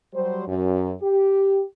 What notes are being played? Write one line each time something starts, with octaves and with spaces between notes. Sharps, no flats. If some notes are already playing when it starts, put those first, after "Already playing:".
F#3 G3 C5
F#2
G4